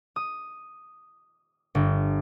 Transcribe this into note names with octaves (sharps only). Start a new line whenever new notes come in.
D#6
G1